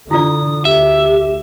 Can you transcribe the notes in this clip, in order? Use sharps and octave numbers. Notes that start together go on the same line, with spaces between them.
D3 E4 F4 D5 D#6
D2 G4 E5